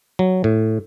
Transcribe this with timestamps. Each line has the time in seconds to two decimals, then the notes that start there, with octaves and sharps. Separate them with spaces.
0.19 F#3
0.44 A2